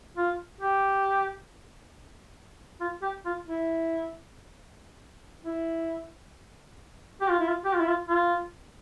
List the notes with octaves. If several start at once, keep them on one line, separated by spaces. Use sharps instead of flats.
F4
G4
F4
G4
F4
E4
E4
G4
F4
E4
F4
G4
F4
E4
F4
F4